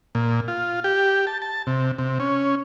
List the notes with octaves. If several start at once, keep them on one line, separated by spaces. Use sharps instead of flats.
A#2
F4
G4
A5
A5
C3
C3
C#4